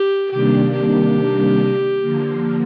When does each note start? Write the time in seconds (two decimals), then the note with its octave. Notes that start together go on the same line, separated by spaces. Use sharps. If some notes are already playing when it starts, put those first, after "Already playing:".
Already playing: G4
0.31 C3 D#3 G3 A#3 D4 G4
0.74 G4
2.01 D3 F3 A#3